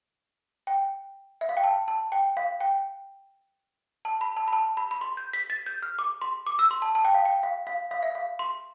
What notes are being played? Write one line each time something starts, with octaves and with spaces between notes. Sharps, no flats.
G5
E5
F5
G5
A5
A5
G5
F5
G5
A5
B5
A5
B5
A5
B5
B5
C6
G6
B6
A6
G6
F6
D6
C6
D6
E6
C6
A5
A5
G5
F5
G5
F5
F5
F5
E5
F5
C6